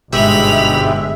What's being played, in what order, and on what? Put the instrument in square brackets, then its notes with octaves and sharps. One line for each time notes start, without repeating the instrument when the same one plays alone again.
[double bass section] G1 G#3 [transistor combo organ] G#2 B2 G4 [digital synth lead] E5 [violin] B5 F7